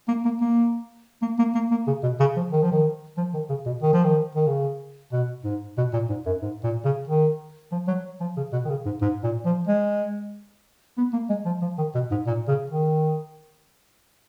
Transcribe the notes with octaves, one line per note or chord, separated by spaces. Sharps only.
A#3
A#3
A#3
A#3
A#3
A#3
A#3
C#3
B2
C#3
F3
D#3
F3
D#3
F3
D#3
C#3
B2
D#3
F3
D#3
D#3
C#3
B2
G#2
B2
A#2
G#2
F#2
G#2
A#2
C#3
D#3
F3
F#3
F3
C#3
B2
D#3
C#3
G#2
G#2
A#2
F3
G#3
B3
A#3
G#3
F3
F3
D#3
B2
G#2
A#2
C#3
D#3